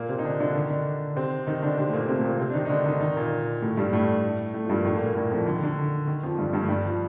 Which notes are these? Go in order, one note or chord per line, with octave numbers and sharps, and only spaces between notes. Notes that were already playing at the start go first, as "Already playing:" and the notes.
Already playing: A#2 A#3
C3 C4
D#4
D3 D4
D3 D4
D#3 D#4
D#4
D3 D4
C3 C4
D#3 D#4
D3 D4
C3 C4
A3
A#2 A#3
C3 C4
A3
A#2 A#3
C3 C4
D4
D#3 D#4
D#4
D3 D4
D#3 D#4
D#3 D#4
A#2 A#3
A2 A3
G2 G3
A2 A3
A2 A3
F3
G2 G3
A#3
A2 A3
A#2 A#3
A#2 A#3
A2 A3
F2 F3
D3
D#3
D3
D#3
F2 F3
G2 G3
G2 G3
A3
G2 G3
F3